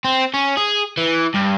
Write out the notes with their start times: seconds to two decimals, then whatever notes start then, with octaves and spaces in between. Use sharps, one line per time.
0.05 C4
0.34 C#4
0.57 G#4
0.98 E3
1.35 G2